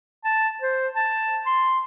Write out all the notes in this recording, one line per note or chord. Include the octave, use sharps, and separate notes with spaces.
A5
C5
A5
C6